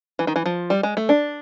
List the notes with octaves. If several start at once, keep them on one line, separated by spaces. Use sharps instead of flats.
E3
D#3
E3
F3
G3
G#3
A3
D4